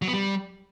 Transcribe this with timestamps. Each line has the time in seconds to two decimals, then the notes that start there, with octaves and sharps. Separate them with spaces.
0.02 F#3
0.08 B3
0.13 G3